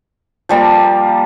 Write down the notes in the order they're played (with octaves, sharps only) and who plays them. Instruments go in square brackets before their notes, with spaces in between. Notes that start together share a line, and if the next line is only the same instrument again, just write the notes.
[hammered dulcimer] F3 G3 A#3